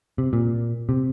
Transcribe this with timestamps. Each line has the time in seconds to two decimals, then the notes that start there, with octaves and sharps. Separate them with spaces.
0.18 C3
0.33 A#2
0.89 C3